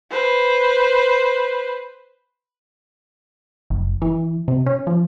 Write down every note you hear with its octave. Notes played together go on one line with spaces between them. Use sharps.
B4 C5
F#1
E3
C3
C#4
F3